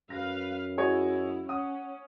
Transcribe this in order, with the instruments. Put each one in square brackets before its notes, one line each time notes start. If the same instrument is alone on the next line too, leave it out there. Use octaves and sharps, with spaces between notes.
[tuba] F#2 [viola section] B4 F5 [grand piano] A#6
[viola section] E4 [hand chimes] F#4 F#5 [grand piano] G#4 C#5 D#5
[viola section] C#4 [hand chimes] F#5 [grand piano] D#6